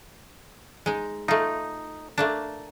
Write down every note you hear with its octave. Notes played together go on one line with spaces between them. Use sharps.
G#3 D#4
A3 D#4 F4
A3 A#3 D4 A5